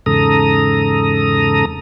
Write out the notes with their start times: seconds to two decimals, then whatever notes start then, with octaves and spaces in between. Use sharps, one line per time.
0.06 E2 G#2 C#3 A4 A#5 D#6